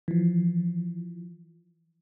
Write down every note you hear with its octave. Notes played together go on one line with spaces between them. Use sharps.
E3 F3